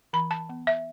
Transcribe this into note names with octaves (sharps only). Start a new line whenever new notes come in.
E3 B5
A5
B3
E5